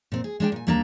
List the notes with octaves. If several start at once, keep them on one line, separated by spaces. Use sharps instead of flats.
A#2 C4
G#4
G#3 D4 G5
A#2 G#5
D#2 G3 A#3 D4 A4 A#5